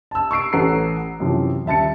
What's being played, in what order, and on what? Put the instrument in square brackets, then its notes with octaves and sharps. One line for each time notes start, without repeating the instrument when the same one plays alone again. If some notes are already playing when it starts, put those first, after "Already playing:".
[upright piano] A5 E6
C#6 E6 C7 D7
A1 A4 B4 F#5 A#5 C7
F#2 C3 E3 F3
D#1 E5 A5 A6 C#7